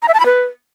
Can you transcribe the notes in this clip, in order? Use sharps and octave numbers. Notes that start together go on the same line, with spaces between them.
A#5
E5
A5
B5
B4